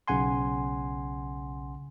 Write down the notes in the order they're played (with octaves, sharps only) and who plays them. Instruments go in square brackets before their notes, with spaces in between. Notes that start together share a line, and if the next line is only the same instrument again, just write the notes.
[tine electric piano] B1 C#3 F#5 G#5 C6